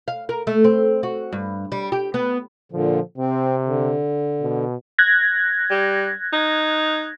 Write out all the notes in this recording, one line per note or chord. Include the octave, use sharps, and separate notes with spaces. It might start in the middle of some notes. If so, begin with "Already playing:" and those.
F5
A#4
A3
C4
F#4
G2
G3
G4
B3
A#2 D3 F3
C3 C4
D3
B2
F#6 G#6 A#6
G3
D#4